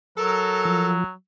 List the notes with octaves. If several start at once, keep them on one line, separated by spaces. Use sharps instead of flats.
F#3 A4 A#4
F3